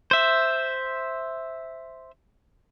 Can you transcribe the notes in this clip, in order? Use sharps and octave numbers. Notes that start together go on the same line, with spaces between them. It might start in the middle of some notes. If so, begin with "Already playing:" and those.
C5 E5